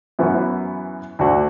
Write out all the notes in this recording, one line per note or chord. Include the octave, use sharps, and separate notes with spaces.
F#2 E3 B3 F#4
D2 D3 A3 D4 F#4